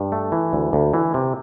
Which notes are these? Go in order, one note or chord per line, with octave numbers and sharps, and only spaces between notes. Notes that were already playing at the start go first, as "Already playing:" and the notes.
Already playing: G2
A3
E3
D2
D2
E3
C3